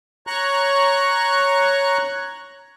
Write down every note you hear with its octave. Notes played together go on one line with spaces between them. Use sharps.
C#5 A#5 C#6 F#6